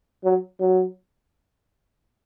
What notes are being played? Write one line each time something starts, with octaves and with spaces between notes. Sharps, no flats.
F#3
F#3